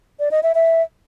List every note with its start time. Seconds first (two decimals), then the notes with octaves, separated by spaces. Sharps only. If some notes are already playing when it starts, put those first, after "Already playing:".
0.20 D5
0.31 D#5
0.43 E5
0.55 E5